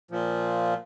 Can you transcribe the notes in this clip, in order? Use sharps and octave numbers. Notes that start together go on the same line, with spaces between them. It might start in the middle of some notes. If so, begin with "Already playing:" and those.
A#2 F3